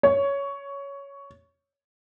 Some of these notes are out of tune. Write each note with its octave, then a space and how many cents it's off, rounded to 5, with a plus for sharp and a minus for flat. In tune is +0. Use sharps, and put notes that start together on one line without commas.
C#5 +10